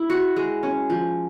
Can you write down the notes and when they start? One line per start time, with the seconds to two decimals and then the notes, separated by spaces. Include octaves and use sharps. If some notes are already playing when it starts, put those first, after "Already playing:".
Already playing: E4
0.10 F#4
0.36 G#3
0.63 C#4
0.90 F3